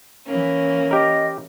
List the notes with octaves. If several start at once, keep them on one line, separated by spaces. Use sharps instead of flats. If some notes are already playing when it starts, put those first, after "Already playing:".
E3 A#3 C#4
G4 A#4 D#5